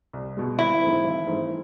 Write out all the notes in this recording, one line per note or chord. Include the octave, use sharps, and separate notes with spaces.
C2
B2 G#3
G#1 E4
G#2 E3 A3 C4
G#1
G#2 E3 A3 C4